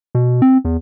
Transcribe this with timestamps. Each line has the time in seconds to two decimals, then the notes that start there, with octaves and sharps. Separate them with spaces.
0.15 B2
0.42 C4
0.65 E2